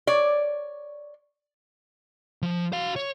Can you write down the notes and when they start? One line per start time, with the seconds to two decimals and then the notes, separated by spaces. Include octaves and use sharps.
0.07 C#5 D5
2.42 F3
2.73 F#4 F5
2.96 C#5